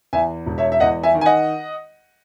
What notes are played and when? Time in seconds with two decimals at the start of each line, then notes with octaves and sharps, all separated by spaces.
0.13 E2 E5 G#5
0.46 E1
0.58 C#5 E5
0.72 E5
0.80 E2 D#5 F#5
1.03 E5 G#5
1.15 D#3
1.21 G#5
1.26 D#5 F#5